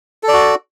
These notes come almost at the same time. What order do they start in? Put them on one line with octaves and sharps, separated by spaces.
A4 D5 F#4